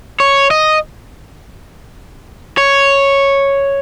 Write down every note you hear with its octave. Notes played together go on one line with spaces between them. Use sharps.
C#5
D#5
C#5